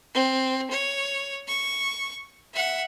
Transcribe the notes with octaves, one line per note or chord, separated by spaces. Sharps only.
C4
C#5
C#6
E5 F#5